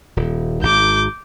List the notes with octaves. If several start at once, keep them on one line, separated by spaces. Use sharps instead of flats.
D#1
G#1 D6 G6